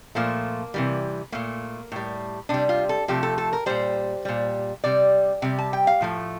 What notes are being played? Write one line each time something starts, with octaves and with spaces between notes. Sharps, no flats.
A#2 F3 A3 A#3
C3 E3 G3
A#2 A3 A#3
A2 G3
C3 G3 D4
F4
A4
C3 F3 A3 G4
A4
A4
A#4
A#2 G3 C5
A#2 G3
C3 G3 D5
C3 G3
A5
G5
F5
A2 F3 A3